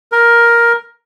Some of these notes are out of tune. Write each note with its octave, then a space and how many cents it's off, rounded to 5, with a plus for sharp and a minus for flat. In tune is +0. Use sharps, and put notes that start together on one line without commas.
A#4 +10